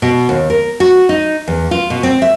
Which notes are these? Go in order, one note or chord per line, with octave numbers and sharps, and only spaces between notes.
B2
D#2
A#4
F#4
D#4
E2
F4
B2
C4
E5